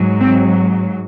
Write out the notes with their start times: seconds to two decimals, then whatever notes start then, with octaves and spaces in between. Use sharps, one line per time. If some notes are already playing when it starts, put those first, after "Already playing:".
Already playing: G#2 F#3
0.19 C4